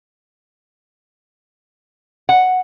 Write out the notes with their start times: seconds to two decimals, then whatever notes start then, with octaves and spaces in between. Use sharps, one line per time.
2.29 F#5